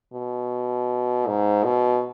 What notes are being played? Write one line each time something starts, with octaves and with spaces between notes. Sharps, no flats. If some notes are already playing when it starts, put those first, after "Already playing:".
B2
G#2
B2